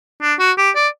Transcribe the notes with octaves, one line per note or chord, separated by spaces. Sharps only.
D4
F#4
G4
D5